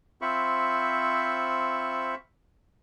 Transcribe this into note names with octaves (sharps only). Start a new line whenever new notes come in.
C4 F4 C5 E5 B5 C#6